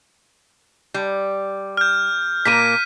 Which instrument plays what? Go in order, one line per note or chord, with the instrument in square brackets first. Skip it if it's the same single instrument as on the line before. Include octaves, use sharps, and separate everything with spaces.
[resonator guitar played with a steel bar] G3
[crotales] F6 G6
[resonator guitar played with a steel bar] A#2 A#3 A#4 [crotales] B6 D#7